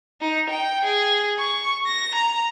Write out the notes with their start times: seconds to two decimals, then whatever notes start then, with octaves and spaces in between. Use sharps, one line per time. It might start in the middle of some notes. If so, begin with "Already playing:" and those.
0.21 D#4
0.50 G5
0.85 G#4
1.39 C#6
1.87 A#6
2.15 A#5